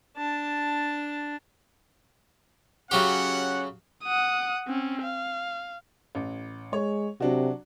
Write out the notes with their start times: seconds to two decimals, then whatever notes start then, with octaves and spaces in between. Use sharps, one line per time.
0.17 D4 A5
2.91 C#3 F#3 C#4 G4 F#5
4.04 F#5 D#6
4.67 C4 C#4
5.02 F5
6.15 A1
6.73 G#3 C#5
7.20 C3 F#3 D4 F#4